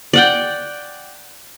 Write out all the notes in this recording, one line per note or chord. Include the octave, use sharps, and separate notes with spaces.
D5 F#5 G5